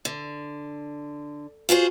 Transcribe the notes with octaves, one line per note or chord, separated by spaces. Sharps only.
D3
F4 F#4 G#4 C5